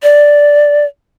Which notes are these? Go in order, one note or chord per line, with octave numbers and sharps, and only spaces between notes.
D5